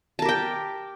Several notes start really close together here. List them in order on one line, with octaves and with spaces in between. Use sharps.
A5 A#4 G4 G5